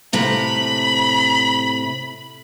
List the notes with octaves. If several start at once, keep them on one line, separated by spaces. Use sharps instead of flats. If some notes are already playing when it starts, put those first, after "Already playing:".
A2 C3 A#5 B5